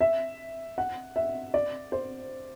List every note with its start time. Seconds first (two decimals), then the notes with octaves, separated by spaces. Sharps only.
0.01 E5
0.78 F#5
1.16 E5
1.54 D5
1.92 C5